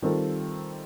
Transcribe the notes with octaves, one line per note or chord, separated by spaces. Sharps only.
D#3 G3 C4 F4 A4